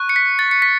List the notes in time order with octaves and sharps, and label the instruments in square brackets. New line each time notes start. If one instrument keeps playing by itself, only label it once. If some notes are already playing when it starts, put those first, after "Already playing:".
Already playing: [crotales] C#6 F#6
C#7
B6
A6
C#7
B6